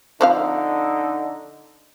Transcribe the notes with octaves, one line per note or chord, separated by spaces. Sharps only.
D3 F3 C4 D#4 F5